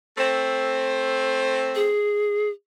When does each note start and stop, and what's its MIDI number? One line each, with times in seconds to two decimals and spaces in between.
0.18 1.86 57
0.18 1.86 60
1.75 2.50 68